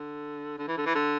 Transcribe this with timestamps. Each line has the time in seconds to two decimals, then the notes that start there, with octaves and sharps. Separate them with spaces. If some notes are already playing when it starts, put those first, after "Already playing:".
Already playing: D3
0.58 D3
0.68 E3
0.77 D3
0.86 E3
0.95 D3